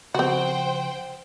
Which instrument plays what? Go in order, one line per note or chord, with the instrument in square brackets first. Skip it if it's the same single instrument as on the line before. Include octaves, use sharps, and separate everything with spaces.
[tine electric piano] C#3 F3 [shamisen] C4 F#4 [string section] C5 F#5 G5